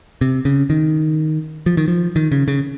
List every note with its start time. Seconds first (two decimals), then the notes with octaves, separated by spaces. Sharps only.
0.21 C3
0.45 C#3
0.70 D#3
1.66 F3
1.77 D#3
1.88 F3
2.16 D#3
2.32 C#3
2.48 C#3